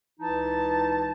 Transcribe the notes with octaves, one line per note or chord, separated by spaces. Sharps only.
C#2 E3 D#4 E4 A5